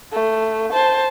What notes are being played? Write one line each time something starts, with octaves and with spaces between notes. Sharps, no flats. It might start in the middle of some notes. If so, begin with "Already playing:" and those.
A3
C5 A5